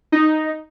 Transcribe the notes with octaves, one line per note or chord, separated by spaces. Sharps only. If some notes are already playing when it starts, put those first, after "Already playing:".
D#4